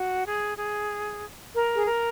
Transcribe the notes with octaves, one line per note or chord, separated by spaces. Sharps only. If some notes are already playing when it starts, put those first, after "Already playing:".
Already playing: F#4
G#4
G#4
A#4
G#4
A#4